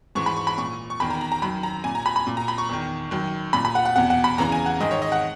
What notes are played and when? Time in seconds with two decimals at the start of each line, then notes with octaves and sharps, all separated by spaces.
0.15 G#2 E3 C#6
0.26 B5
0.36 C#6
0.47 B5
0.58 A#2 C#6
0.90 C#6
1.00 E2 D#3 B5
1.10 A#5
1.21 A#5
1.32 A#5
1.42 F#2 D#3 B5
1.63 A#5
1.84 A#2 G#5
1.95 A#5
2.06 B5
2.16 B5
2.27 A#2
2.37 A#5
2.48 B5
2.58 C#6
2.69 E2 D#3
3.11 F#2 D#3
3.53 A#2 B5
3.65 B5
3.75 F#5
3.85 F#5
3.96 E2 B2 F#5
4.10 F#5
4.24 B5
4.38 E2 C#3 E3 A#5
4.52 G#5
4.66 F#5
4.80 G#2 D#3 D#5
4.91 C#5
5.02 D#5
5.12 F#5